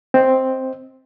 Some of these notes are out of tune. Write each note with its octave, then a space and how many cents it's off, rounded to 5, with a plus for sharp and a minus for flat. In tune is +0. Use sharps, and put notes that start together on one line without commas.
C4 +0 D#5 +15